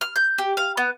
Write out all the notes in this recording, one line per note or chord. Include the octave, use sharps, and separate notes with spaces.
F6
G6
G4
F5
B3